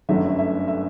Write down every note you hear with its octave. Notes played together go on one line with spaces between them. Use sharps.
G1 F#2 F#3 A3 E5
E5
E5